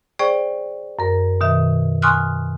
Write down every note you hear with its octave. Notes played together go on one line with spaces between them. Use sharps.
G#4 C5 D5 G5 C#6
F#2 A#4
B2 D#3 E5
G#5 C6 C#6 D#6 F6 F#6